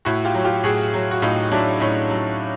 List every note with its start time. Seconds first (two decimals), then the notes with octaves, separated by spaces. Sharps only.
0.05 A2 E4 F#4
0.25 F4 G4
0.34 F#3
0.44 F4 G4
0.64 A2 F#4 G#4
0.94 F#3
1.11 F#4
1.22 A2 D#4 F4
1.52 F#3 D4 E4
1.80 A2 C#4 D#4
2.10 F#3